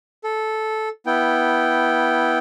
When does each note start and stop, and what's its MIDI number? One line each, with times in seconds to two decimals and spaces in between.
0.24 0.89 69
1.06 2.39 59
1.06 2.39 64
1.06 2.39 79